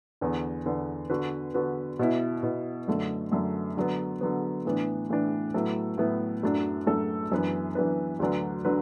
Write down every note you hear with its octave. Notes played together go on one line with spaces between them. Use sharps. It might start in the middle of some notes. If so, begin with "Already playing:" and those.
E2 D3 B3
E2 D3 B3
D3 B3 F#4 B4
D3 B3 F#4 B4
B2 B3 E4
B2 B3 E4
F#2 D3 A3
F#2 D3 A3
D3 F#3 B3
D3 F#3 B3
A2 E3 B3 D4
A2 E3 B3 D4
A2 F#3 B3 E4 A4
A2 F#3 B3 E4 A4
F#2 F#3 A3 D4 A4
F#2 F#3 A3 D4 A4
F#2 E3 B3 D4 B4
F#2 E3 B3 D4 B4
D2 D3 F#3 D4 B4
D3 F#3 D4 B4